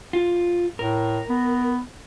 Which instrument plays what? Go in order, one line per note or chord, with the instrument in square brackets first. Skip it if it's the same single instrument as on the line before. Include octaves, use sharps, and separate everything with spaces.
[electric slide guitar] F4
[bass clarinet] A2 [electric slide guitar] A#4
[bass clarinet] B3